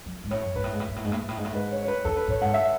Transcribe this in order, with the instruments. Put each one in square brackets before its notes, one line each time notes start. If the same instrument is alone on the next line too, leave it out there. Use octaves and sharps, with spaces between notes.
[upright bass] F#3
G#2
[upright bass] A2 [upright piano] C#5
[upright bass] F#2
[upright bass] G#2 [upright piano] B4
[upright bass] A2
G#2
A2
G#2
A2
G#2
A2
G#2
A2
G#2
A2
[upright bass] G#2 [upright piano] B4
[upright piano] C#5
C#5
B4
[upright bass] E2 [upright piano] A4
[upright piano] B4
[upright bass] A2 [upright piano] C#5
[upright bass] G#2 [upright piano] F#5
[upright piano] E5